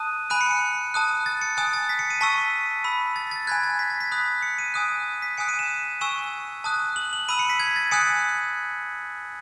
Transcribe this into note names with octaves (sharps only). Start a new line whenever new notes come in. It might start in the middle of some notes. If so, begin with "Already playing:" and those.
Already playing: A5 D#6 F#6 D#7
G#5 B5 F#6 D#7
C#7
C#7
A5 D#6 F#6
A6
C#7
G#5 D#6 F#6 A6
A6
B6
C#7
D#7
A5 C#6 E6 B6
B5 E6
A6
A6
G#5 B5 F#6 G#6
A6
B6
A6
B6
B5 D#6 F#6
C#7
D#7
G#5 D#6 F#6
B6
G#5 D#6 F#6 C#7
D#7
E7
G#5 C#6 E6 E7
A5 D#6 F#6
F#7
F#7
B5 E6 D#7
C#7
B6
G#6
A6
G#5 D#6 F#6 C#7